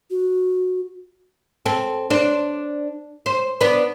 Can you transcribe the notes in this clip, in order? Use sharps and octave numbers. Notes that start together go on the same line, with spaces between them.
F#4
C4 A4
D4 C5
C5
B3 D4